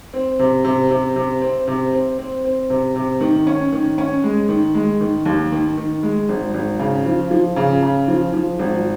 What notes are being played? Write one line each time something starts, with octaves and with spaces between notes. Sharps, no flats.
C4
C3
C3
C3
C3
C4
C3
C4
C4
C4
C3
C3
D#3
C#4
D#3
C#4
G#3
D#3
G#3
D#3
D#2
D#3
D#3
G#3
G#1
G#1
C#3
F3
F3
C#3
C#3
F3
F3
G#1